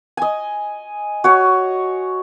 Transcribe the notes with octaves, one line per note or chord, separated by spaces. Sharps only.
D#5 G#5
F#4 C#5